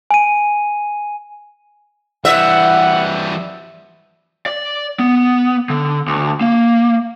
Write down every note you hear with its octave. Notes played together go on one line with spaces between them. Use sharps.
G#5 D#7
E3 G3 E5 F#5
D5
B3
D3
D2
A#3